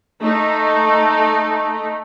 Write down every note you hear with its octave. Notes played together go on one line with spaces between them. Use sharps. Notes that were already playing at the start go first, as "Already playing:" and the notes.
A3 D#4